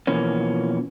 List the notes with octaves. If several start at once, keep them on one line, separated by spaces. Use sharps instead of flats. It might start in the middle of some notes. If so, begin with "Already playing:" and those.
B2 E3 F3 A#3 C#4